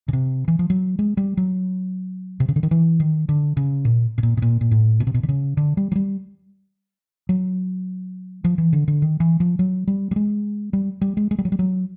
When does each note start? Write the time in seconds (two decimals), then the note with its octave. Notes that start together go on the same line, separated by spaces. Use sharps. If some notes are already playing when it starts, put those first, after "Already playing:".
0.08 C#3
0.13 C3
0.48 E3
0.59 F3
0.70 F#3
0.99 G#3
1.17 G3
1.37 F#3
2.40 C3
2.48 C#3
2.56 D3
2.63 D#3
2.71 E3
3.00 D#3
3.29 D3
3.57 C#3
3.85 A#2
4.18 B2
4.23 A#2
4.37 B2
4.42 A#2
4.61 A#2
4.71 A2
5.00 B2
5.07 C3
5.14 B2
5.23 D3
5.28 C#3
5.57 D3
5.77 G3
5.92 F#3
5.95 G3
7.29 F#3
8.44 F3
8.58 E3
8.73 D3
8.88 D3
9.02 D#3
9.20 E3
9.40 F3
9.59 F#3
9.87 G3
10.11 G3
10.16 G#3
10.73 G3
11.01 G3
11.17 G#3
11.31 G#3
11.38 G3
11.45 F#3
11.52 G3
11.59 F#3